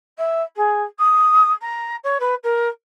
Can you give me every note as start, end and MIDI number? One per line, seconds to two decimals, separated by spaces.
0.17 0.42 76
0.56 0.83 68
0.98 1.50 87
1.61 1.95 82
2.04 2.17 73
2.20 2.34 71
2.43 2.68 70